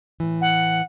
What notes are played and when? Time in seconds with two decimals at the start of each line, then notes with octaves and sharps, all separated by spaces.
0.20 A2 E3
0.41 F#5